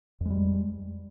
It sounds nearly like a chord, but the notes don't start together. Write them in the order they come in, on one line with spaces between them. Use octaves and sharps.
F2 G#3 G3